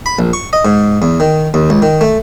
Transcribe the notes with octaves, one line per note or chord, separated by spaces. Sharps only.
B5
A#1
C#6
D#5
G#2
E2
D#3
D#2
C#2
D#3
A3